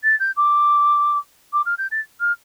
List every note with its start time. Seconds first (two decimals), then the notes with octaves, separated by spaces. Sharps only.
0.04 A6
0.20 G6
0.37 D6
1.53 D6
1.66 F6
1.78 G6
1.92 A6
2.20 F6